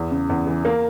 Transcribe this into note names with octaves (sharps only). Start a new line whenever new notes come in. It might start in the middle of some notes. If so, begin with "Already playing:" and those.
Already playing: E2
C#3
E2
E3
A#3